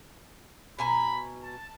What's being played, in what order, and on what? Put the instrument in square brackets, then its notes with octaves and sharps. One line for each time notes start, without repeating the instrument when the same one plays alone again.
[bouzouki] B2 G#5 A#5 [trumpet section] B5
[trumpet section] A5